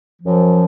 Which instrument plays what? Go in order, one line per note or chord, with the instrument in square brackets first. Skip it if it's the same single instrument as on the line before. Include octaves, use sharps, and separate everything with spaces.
[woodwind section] F#2 F3